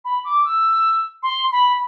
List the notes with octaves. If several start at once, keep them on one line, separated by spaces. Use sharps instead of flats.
B5
D6
E6
C6
B5